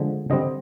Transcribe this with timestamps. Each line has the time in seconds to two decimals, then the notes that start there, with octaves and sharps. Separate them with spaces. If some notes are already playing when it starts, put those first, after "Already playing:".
Already playing: D3 F3 G#3
0.30 D3 G3 C4 D#5